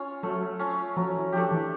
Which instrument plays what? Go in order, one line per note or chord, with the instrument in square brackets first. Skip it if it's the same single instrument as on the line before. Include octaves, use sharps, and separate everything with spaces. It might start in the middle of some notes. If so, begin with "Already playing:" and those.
Already playing: [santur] C#4 F4
[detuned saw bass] F#3 [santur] A3
[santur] C#4 F4
[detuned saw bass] F3 [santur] F#3
[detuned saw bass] E3
[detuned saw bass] F3 [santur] A3 D4 G4
[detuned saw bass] E3